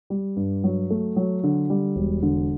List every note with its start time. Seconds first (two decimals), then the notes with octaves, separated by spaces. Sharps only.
0.10 G3
0.36 G2
0.64 F#3
0.90 A3
1.16 F#3
1.44 D3
1.70 G3
1.96 E1
2.22 D3